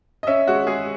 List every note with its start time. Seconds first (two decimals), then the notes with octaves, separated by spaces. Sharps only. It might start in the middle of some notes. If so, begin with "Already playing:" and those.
0.23 D#5
0.27 C#4 E5
0.47 G#3 F#4
0.67 G#3 G#4